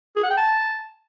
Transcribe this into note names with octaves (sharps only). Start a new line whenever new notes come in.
G#4
F#5
G5
A5